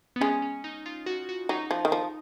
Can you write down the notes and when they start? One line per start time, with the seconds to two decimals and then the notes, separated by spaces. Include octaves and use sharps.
0.16 B3
0.21 G#3 C#4
0.42 C#4
0.64 D#4
0.86 F4
1.06 F#4
1.29 F#4
1.49 F#3 D#4
1.71 F3
1.85 D#3
1.92 F3